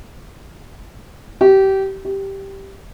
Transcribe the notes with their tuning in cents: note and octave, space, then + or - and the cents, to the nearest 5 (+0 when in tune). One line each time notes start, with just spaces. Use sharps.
G4 -25
G4 -5